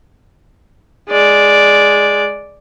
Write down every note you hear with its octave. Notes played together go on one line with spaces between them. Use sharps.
G#3 D5